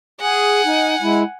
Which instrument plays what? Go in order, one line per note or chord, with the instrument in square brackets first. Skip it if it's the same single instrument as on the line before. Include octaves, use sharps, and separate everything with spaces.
[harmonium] G#4 [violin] F#5 G#5
[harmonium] D#4
G#3 E4